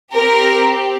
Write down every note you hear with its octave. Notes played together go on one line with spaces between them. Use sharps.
C4 G4 A#4